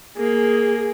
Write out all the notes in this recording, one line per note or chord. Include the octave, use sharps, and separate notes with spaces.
A#3 G#4